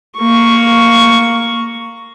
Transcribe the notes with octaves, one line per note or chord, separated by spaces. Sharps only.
A#3 C#6